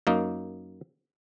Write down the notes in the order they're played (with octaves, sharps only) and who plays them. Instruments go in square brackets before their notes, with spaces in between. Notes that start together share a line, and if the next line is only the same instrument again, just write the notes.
[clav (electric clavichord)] F#2 A#3 D#4